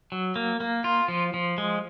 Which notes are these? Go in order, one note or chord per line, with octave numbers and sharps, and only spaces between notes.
F#3
A#3
A#3
F4
F3
F3
G#3